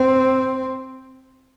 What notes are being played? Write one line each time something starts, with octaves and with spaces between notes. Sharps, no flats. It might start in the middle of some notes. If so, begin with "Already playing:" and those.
Already playing: C4